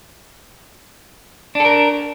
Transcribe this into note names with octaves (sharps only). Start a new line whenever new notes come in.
D4 A4 A#4